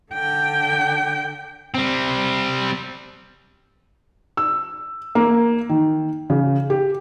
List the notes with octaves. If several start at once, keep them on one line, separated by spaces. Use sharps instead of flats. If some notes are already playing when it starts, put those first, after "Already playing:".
D3 G5
G3 C4
E6
A#3
D#3
C#3
G4